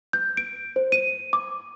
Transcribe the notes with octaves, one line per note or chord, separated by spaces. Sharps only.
G6
D7
C5
D#7
D6